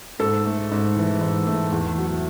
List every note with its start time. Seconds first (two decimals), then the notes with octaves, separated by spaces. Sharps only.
0.19 G#2 A4
0.45 A3
0.71 G#2
0.97 E3
1.21 G#2
1.47 A3
1.72 E2
1.98 F#3